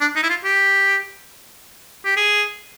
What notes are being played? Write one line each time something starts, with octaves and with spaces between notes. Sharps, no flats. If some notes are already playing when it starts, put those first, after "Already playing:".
D4
D#4
E4
F4
G4
G4
G#4